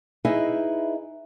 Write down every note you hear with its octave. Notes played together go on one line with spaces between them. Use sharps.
D#4 E4 G#4 B4 D#5 E5